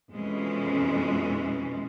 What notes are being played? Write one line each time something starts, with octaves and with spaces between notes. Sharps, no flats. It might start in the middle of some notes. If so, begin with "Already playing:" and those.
F2 B2 E3 G#3 C#4